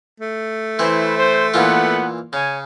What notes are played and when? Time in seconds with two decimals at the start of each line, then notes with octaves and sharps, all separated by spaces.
0.20 A3
0.79 E3 C4 E4 B4 C5
1.16 C5
1.54 A#2 E3 B3 F4 F#5
2.33 C#3 C#5 G#5